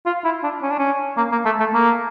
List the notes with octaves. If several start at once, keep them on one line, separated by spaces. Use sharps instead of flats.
F4
E4
D4
C#4
D4
C#4
A#3
A#3
A3
A3
A#3